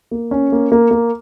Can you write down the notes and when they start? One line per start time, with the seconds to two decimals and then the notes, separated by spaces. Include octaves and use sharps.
0.11 A#3
0.31 C#4
0.52 A#3
0.72 A#3
0.91 A#3